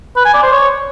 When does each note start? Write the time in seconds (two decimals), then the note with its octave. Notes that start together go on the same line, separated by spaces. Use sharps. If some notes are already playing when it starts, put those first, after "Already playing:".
0.16 B4
0.25 G#5
0.34 D5
0.43 C5
0.52 C#5